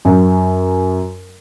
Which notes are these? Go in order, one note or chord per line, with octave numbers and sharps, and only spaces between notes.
F#2